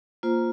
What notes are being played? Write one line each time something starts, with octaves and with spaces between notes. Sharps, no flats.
A#3 F4 C5